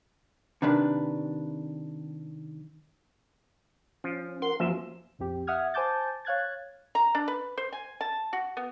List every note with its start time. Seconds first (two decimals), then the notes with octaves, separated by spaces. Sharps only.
0.62 C3 D#3 D4 B4
4.04 F3 C#4
4.42 A#4 F#5 C6
4.60 F#2 F3 A#3 F#4 E5
5.19 A#1 F2 C4 G4
5.47 E5 F#5 D#6 F6 G#6
5.74 C5 G#5 A5 D6 G6 A6
6.25 C#5 F5 F#6 G#6 A6
6.95 A#5
7.15 D4
7.28 B4
7.57 C5
7.72 G#5
8.01 A5
8.33 F#4
8.57 B3